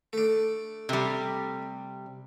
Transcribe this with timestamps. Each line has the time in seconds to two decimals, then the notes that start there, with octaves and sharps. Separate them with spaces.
0.13 A3 D4
0.89 C3 G3